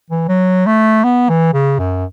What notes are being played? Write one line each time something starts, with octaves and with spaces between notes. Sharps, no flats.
E3
F#3
A3
B3
E3
C#3
F#2